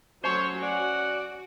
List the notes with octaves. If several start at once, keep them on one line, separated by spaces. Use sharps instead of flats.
F#3 A3 C#4 C5 C#5
F#4 D5 F#5